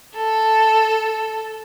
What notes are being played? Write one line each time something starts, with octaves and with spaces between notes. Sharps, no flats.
A4